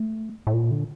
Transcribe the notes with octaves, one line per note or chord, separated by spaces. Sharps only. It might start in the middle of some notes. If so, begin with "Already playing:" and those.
Already playing: A3
A2
A#2
D3